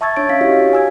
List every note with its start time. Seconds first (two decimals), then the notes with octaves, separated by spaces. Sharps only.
0.01 E5 A5 C#6 E6 G#6 A6
0.16 D4 C#5 C#6 D7
0.29 C#4 F5 B6
0.41 E4 F#4 G4 C#5 D#5
0.52 F5
0.73 G#5 E6 G#6